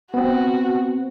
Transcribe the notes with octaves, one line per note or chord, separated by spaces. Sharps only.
B3 C4 F#4